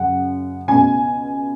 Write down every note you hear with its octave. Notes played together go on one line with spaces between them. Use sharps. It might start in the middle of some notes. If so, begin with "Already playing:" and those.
Already playing: F#2 C#3 F#5
C#2 B2 G#5